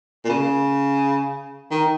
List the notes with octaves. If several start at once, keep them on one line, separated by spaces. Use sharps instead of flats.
A#2
C#3
D#3